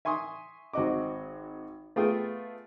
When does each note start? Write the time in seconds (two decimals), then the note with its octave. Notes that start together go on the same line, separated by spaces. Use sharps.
0.05 E5 G#5 C6 C#6 D#6
0.73 G#1 C4 F#4 D#5 D6
1.96 A3 B3 F4 G#4 G5 D#6